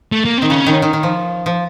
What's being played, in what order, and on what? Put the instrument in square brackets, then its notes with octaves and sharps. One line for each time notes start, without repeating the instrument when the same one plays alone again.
[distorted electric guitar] A3
A#3
[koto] D#3 [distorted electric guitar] C4
[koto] C#3 [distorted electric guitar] C#4
[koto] D#3
D#3
D#3
F3
F3